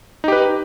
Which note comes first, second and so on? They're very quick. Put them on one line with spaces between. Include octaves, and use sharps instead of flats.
D#4 G4 B4